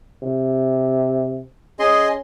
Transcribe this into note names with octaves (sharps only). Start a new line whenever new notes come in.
C3
C#4 G#4 D#5 C6